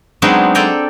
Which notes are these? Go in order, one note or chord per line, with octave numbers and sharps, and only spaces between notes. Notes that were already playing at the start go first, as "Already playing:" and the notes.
F#3 G#3 B3 C4 D4 D#4
A4 D5 G5 G#5 A#5